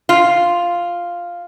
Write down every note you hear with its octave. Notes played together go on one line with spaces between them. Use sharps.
F4